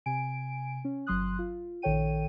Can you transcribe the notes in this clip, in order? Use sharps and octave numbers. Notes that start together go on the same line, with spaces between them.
C3 G#5 D7
C#4
G1 F#3 C6 D#6 F#6
F4
A#1 D#3 A4 C#5 G5 D#7